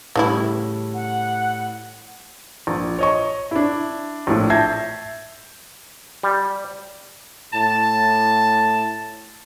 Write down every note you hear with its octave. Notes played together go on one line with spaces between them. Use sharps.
A2 C#3 E3 G3 E4
F#5
A#1
C#5 D#5 C#6
D4 E4
A#1 A2
E5 A5 G6 G#6 A#6 C7
G3
A2 A5